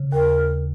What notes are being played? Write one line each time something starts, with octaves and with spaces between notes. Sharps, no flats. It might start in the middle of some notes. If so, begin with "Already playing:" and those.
Already playing: C#3
D#2 A#4